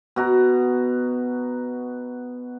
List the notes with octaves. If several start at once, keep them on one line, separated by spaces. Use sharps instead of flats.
B2 F#4 A#5